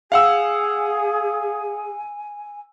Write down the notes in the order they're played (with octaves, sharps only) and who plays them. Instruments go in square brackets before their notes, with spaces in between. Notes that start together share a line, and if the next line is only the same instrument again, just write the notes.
[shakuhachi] G#4 [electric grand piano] F5 F#5 E6 [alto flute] G#5